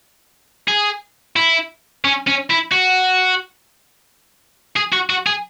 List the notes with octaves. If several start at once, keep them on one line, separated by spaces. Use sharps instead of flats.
G#4
E4
C#4
C#4
E4
F#4
G#4
F#4
F#4
G#4